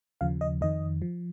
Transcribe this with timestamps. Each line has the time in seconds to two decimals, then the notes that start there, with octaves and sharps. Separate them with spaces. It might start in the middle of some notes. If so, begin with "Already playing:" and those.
0.21 D#2 C#3 F3 F5
0.41 D#5
0.61 F2 D#3 D#5
1.02 F3